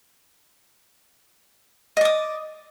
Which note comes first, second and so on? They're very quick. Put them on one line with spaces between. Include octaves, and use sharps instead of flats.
D#5 D5 D#6